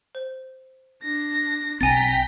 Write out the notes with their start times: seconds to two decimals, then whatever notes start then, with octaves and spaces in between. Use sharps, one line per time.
0.15 C5
1.03 D4 A#6
1.81 B1 C4 G5 G#5 A#5 A6 B6